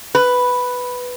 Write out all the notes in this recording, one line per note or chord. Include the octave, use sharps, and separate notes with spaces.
B4